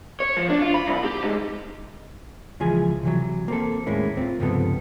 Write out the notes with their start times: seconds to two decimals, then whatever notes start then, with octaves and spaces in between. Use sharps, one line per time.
0.20 C#5
0.37 F3
0.50 D4
0.62 F4
0.74 B5
0.86 C2
1.05 G4
1.23 G#2
2.60 C#2 E3 F3 G#4 G#5
3.03 C3 E3 F#3
3.48 A#3 C4 A4
3.86 D#2 A2 G#3 A#3 C#4 E4
4.17 C4 F4
4.40 C#2 G2 C3 F3 B3 A4